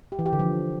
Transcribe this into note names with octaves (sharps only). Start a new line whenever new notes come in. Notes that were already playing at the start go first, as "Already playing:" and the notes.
G4
E3
G4
D3
F3